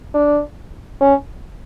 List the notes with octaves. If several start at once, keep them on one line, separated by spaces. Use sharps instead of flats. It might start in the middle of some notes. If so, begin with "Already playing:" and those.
D4
C#4